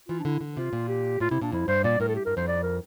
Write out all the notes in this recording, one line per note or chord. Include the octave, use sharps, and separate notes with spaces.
E3 F4
D4
D3 E4
D3
C3 F4
A#2
G4
A2 F4
C3 E4
A#2 D4
F2 E4
G2 C5
A#2 D5
A2 A#4
A4
G4
G2 A#4
F2 C5
D5
A#4